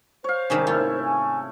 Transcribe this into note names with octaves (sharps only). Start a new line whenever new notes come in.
C5 C#5 F5
G#2 C3 D#3 G3 C#4
A3 E4 F4
G#5